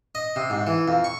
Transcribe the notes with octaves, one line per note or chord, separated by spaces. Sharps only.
D#5
C3
G#2
E3
F2
C#6